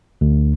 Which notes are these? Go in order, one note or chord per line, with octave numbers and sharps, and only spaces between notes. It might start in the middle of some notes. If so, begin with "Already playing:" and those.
D2